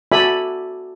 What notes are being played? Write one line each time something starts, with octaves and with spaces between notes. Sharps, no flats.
F#4 A4 D5 E5 G#5 B5